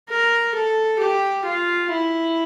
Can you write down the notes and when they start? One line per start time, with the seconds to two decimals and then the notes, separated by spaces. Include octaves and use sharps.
0.09 A#4
0.54 A4
0.99 G4
1.45 F4
1.90 E4